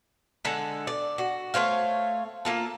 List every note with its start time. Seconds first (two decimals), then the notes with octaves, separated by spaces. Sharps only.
0.45 D3 G#3 A4
0.87 D5
1.18 F#4
1.54 A3 C5 C#5 F5
2.45 A#3 F4 A4